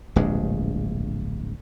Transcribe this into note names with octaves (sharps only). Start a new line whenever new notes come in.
D1 A#1 G2 G#3